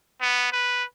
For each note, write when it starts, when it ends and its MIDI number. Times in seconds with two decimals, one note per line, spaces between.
0.21 0.51 59
0.52 0.84 71